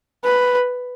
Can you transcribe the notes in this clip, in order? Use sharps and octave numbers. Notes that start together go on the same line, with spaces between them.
B4